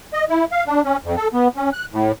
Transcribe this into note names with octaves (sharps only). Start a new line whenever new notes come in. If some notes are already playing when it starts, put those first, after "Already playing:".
D#5
E4
F5
D4
C#4
F2
A4
B3
C#4
F#6
A2